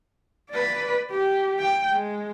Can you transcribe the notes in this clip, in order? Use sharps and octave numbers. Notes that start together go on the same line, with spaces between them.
B4 D5
G4
G5
G#3